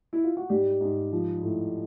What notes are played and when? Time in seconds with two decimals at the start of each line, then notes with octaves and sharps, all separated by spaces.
0.13 E4
0.24 F4
0.37 F#4
0.49 G#2 G3 G4
0.81 G#2
1.12 F3
1.43 A2